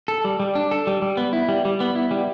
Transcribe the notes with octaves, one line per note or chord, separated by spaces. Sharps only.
A4
G3
G3
D4
A4
G3
G3
B3
E4
G3
G3
B3
E4
G3